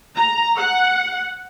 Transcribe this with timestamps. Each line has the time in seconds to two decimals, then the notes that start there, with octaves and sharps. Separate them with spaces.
0.17 A#5
0.57 F#5